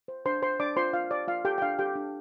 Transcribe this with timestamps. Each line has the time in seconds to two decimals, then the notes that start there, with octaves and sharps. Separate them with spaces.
0.08 C5
0.25 D4 C5 C6
0.42 C5 C6
0.60 D4 D5 D6
0.77 F4 C5 C6
0.93 F4 F5
1.10 C5 D5
1.28 F4 F5
1.45 G4 A4 G5
1.58 G5
1.62 D4 F5
1.79 G4 A4 G5
1.95 D4